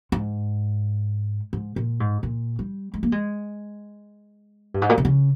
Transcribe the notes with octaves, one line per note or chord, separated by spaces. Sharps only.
G#2
G#2
A#2
G#2
A#2
G3
G#3
A#3
G#3
G2
G#2
A#2
C3
C#3